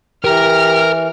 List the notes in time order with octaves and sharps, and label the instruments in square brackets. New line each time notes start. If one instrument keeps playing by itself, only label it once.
[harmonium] E3 [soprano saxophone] G4 [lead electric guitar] A#4 A#5 [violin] F6